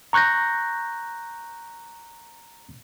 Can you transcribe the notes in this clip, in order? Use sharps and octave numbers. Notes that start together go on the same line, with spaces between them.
A#5 C#6 F#6 G6 A#6